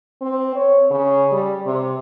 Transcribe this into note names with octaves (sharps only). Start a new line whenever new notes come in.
C4
C#5
C#3
G3
C3